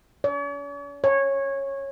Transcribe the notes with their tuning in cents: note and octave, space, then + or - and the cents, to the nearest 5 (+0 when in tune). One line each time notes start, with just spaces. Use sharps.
C#5 +45
C#5 -15